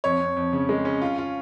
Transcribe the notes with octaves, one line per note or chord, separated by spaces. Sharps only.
F2 C#5
F2
F2
C#3
G#3
C#4
F4
F4